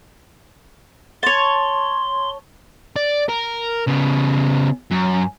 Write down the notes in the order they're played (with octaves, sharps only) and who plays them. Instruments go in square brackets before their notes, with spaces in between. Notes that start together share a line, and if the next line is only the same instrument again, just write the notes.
[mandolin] C#5 A5 [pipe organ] C6
[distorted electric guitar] D5
A#4
C#3 B3
F#2